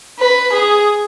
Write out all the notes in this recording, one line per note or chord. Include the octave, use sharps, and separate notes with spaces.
B4
G#4